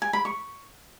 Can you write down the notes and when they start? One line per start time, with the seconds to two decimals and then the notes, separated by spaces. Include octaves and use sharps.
0.02 G#5
0.13 B5
0.25 C#6